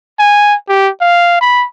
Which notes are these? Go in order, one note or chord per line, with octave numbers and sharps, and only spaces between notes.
G#5
G4
F5
B5